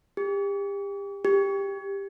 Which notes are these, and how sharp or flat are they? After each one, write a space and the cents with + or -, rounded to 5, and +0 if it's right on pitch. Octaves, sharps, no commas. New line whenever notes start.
G4 +35
G4 +15